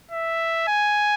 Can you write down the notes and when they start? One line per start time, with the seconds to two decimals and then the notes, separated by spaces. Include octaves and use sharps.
0.11 E5
0.68 G#5